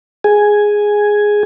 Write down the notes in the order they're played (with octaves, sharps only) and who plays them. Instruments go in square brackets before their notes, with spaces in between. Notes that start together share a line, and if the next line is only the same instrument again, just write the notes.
[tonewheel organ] G#4 G#5